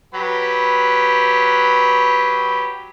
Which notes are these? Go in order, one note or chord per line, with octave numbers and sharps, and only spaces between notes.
F#3 G4 B4